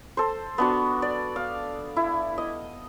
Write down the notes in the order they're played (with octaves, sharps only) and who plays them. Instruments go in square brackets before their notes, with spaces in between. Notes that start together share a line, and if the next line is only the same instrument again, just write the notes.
[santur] A4 C5
B3 D4 F#4
D5
F5
E4
D#5